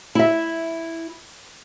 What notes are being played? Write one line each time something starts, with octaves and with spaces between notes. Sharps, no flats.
E4 E5